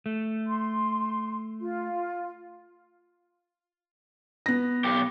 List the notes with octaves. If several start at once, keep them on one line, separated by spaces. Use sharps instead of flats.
A3
C6
F4
B3 A#6
B1 G4